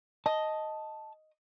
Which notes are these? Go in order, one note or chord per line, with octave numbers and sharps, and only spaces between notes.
D#5 A5